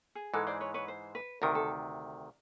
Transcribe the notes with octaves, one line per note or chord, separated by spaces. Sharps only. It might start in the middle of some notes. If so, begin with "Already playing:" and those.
G#4
G#2 E3 G#3 A4
C5 D5
B4 C#5
B4 C#5
C5
B4
D2 C3 D#3 A#4
A4